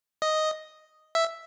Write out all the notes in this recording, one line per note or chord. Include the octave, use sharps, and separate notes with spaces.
D#5
E5